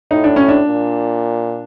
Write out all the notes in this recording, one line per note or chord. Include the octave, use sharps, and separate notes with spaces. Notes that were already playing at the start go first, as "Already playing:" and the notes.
A2 D#4
D4
C#4
D4
A#2